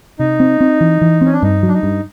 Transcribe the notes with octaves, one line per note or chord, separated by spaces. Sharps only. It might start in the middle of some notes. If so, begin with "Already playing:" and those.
C3 D#4
C4
C4
E3
E3
C4 C#4
D4
G2 D#4
F#3 D4
D#4
G2